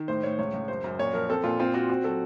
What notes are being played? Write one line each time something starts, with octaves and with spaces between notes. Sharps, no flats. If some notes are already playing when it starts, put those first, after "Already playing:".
Already playing: D#3
A2 C5
A2 C#5
C#2 C#5
C#2
F#2 C5
F#2
A#2 C#5
F3 A#4
C4 A4
A#2 F4
C4 F4
C4 F#4
C4 F#4
F#3 A4